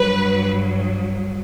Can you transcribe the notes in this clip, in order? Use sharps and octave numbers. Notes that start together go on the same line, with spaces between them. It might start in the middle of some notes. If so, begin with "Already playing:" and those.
Already playing: G2 F#3 B4